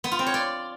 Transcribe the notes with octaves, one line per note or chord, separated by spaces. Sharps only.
B3
F4
C4
C#5
D5